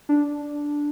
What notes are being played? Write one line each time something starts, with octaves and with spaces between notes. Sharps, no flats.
D4